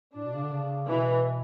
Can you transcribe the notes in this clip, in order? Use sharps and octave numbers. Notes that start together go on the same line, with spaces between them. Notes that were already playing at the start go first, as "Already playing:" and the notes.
A2 D4
B2
C#3
D3
C#3
B2 E3